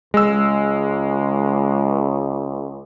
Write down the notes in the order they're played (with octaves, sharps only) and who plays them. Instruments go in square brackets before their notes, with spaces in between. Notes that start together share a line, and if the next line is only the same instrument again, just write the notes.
[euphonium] C#2 [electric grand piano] G#3 E6